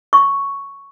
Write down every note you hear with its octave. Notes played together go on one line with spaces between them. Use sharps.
C#6